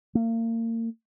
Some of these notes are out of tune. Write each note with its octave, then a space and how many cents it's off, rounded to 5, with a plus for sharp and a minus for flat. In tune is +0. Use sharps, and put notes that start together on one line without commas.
A#3 -35